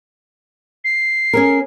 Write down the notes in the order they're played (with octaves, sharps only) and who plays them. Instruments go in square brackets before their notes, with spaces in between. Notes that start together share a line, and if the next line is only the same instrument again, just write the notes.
[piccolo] C7
[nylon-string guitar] C#4 G#4 A#4